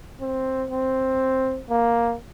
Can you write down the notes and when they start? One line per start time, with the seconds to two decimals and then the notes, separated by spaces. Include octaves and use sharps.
0.21 C4
0.71 C4
1.70 A#3